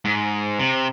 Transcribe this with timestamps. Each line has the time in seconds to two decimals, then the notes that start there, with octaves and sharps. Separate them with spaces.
0.05 G#2
0.59 C3